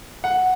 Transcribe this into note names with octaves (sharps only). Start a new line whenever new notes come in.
F#5